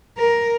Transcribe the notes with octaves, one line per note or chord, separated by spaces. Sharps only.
A#4